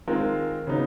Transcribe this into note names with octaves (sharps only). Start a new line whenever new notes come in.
D#3 G#3 C4 F4 A#4
C#3 F#3 B3 D#4